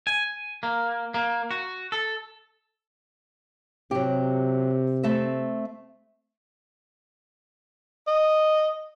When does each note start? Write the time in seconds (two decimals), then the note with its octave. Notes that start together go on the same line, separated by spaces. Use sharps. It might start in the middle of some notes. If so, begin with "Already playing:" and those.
0.07 G#5
0.63 A#3
1.14 A#3
1.51 F#4
1.92 A4
3.91 C3 F#3 G4
5.03 A3 C4 E5
8.07 D#5